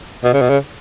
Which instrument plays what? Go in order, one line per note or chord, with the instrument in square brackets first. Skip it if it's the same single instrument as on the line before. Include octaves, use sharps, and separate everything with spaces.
[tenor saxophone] B2
C#3
B2
C#3